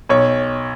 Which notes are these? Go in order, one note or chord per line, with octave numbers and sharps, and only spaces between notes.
B1 C#5